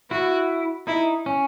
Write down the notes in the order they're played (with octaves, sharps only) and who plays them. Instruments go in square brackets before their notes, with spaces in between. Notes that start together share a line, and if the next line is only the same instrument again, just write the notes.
[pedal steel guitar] E4 [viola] F#4
[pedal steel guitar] D#4 [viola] E4
[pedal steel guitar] C#4